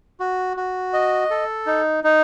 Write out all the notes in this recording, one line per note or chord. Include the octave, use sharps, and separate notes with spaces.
F#4
F#4
D#5
A4
D#4
D#4